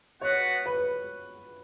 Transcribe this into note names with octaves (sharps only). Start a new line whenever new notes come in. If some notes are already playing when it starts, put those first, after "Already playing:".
B3 F#4 B4 C#5 F#5
B4